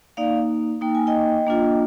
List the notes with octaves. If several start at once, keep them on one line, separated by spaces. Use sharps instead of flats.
A#3 D#4 D5 F5
A#3 D#4 G5
G#5
D#5 G5
A#3 D4 F4